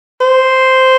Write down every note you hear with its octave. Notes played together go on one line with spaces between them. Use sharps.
C5